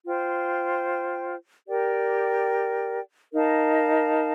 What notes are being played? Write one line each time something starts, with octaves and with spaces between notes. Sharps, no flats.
F4 C5 G5
G4 A#4 D5 G5
D#4 A#4 F5 A5